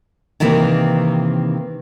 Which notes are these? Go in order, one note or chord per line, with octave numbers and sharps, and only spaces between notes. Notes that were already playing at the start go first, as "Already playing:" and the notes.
C3 D#3 E3 A#3 C4